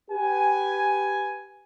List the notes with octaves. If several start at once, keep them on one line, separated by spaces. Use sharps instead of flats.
G4 B4 G#5